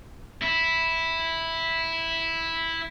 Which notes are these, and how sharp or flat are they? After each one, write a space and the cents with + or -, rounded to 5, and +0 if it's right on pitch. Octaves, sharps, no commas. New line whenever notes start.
E4 -5